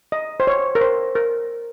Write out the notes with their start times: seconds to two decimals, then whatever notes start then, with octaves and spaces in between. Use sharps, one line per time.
0.12 D#5
0.40 C5
0.47 C#5
0.75 A#4
0.81 C5
1.15 A#4